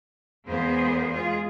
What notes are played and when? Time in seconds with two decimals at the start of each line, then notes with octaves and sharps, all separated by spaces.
0.47 E2 G#3 A#3 B3 G#4 C5
1.12 G#3 F4 G#4